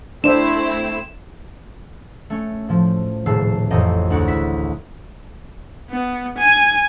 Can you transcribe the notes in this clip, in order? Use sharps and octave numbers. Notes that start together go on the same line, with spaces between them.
A3 C4 D4 E4 C5 E5 E7
A3 C#4
A2 F3
D#1 A2 C#3 A5 E6 C7
A1 F2 G4 D#5 G5 A#6
D2 F#4
E4 B6
B3
G#5